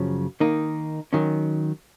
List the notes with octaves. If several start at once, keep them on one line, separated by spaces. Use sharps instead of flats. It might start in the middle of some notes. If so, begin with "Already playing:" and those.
Already playing: F#2 C#3 F3
D#3 A#3 D#4
D#3 F#3 C#4